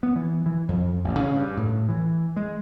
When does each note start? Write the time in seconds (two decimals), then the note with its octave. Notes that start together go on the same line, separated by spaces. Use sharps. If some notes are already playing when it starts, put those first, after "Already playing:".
0.03 B3
0.16 E3
0.46 E3
0.68 F2
1.04 A1
1.19 C#3
1.36 G2
1.57 A2
1.89 E3
2.36 G#3